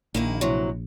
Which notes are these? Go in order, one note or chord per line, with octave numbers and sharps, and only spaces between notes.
A#1 D#3 A#3 E4
C3 E3 F#3